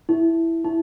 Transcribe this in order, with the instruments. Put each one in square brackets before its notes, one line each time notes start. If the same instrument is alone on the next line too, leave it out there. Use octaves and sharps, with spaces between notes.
[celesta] E4
E4